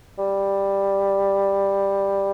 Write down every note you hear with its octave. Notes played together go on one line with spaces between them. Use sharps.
G3